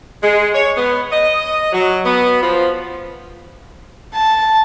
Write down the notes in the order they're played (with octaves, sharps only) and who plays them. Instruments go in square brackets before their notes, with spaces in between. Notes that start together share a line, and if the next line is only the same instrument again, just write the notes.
[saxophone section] G#3
C#5
B3
D#5
F#3
B3
F3
[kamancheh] A5